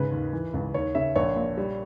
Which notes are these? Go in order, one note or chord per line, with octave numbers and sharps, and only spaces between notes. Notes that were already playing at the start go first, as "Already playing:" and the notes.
Already playing: G#2 C#3 B4
D#2
E3
C#2
D#2 C#5
C#3 E5
A#1 C#5
A#2
G3